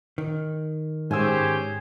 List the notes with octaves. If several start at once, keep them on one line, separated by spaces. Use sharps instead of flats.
D#3
G#2 C#4 G4 G#4 C5 G#5 E6